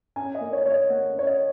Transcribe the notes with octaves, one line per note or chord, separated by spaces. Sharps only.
C#4 G#5
D#5
A#3
C#5
A#3 C#5
D#5
A#3 F#5
C#4 C#5
D#5